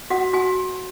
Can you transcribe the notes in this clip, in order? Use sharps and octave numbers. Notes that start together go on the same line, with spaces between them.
F#4 F#5
F#4 G#5